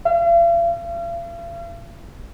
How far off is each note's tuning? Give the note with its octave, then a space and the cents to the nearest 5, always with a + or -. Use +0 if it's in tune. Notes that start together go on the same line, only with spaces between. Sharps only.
F5 -45